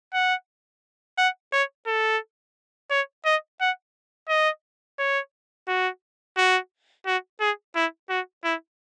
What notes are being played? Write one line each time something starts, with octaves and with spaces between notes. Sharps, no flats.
F#5
F#5
C#5
A4
C#5
D#5
F#5
D#5
C#5
F#4
F#4
F#4
G#4
E4
F#4
E4